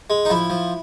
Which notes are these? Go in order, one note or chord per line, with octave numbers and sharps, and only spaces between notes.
G#3
D#4
F3 E4
F3